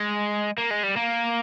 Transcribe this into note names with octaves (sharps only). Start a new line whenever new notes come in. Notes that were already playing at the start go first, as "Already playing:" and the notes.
Already playing: G#3
A#3
G#3
G3
A#3